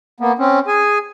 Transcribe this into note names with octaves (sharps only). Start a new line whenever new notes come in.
A#3 B3
C4 C#4
G#4 G#5